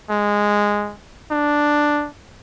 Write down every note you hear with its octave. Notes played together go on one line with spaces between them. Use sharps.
G#3
D4